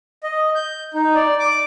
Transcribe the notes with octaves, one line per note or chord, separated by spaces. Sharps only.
D#5
G6
D#4
D5
D6